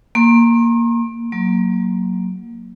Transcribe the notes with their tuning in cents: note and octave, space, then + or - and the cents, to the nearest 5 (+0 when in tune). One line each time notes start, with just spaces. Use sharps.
A#3 +0 C6 +45
F#3 +0 A#3 +0